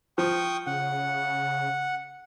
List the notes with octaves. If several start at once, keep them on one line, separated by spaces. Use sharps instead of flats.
F3 G5 C#6 D#6
C#3 F#5